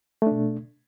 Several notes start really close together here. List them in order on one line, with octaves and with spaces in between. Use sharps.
A3 D4 B2